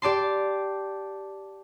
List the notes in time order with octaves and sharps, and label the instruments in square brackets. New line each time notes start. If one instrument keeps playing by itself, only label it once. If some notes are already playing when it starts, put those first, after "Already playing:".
[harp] G4 D5 A5 C6